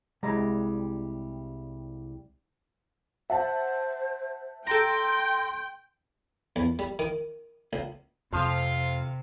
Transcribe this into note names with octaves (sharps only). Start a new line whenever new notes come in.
C2 G3 G#3 A#5
C5 E5 F#5 A5
A4 G5 A#5 C6
E2
G3
D#3
C#2
F2 C3 F3 F4 F5